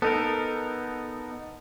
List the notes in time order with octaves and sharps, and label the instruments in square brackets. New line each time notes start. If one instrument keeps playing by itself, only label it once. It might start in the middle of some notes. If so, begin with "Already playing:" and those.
[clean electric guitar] B3 D#4 A#4 [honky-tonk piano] A4